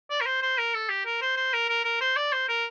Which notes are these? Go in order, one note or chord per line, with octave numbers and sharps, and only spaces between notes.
D5
A#4
C5
C5
A#4
A4
G4
A#4
C5
C5
A#4
A#4
A#4
C5
D5
C5
A#4